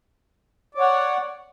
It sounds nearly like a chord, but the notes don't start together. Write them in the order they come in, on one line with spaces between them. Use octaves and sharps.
D5 C#5 F#5